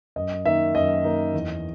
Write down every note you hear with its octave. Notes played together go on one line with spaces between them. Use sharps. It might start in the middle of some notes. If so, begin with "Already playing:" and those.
F#2 D#5
D#3 A#3 D#4 E5
F#2 D#5
D#3 A#3 D#4
E2